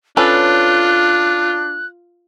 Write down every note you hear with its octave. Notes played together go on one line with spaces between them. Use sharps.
C#4 D4 F4 A4 B4 F#6